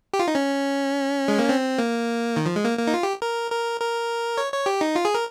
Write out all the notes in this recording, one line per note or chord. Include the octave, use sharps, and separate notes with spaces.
G4
F4
D#4
C#4
G#3
A#3
C4
A#3
D#3
F3
G#3
A#3
A#3
D#4
F4
G4
A#4
A#4
A#4
C#5
C#5
G4
D#4
F4
G#4
A#4